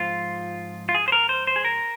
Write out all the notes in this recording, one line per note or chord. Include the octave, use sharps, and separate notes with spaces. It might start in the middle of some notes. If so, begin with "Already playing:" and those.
Already playing: G#2 F3 G#3 C4 F4
F4
G#4
C5
A#4
C5
C5
G#4
A#4